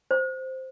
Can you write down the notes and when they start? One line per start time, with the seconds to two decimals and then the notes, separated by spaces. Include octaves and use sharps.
0.11 C5